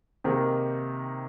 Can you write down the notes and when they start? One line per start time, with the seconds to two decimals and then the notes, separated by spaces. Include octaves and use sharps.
0.24 C3 D#3 A#3 D#4 G#4